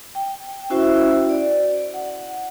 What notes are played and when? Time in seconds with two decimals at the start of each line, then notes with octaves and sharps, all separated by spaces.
0.15 G5
0.70 C#4 E4 F#4 C5 E5
1.30 D5
1.94 F#5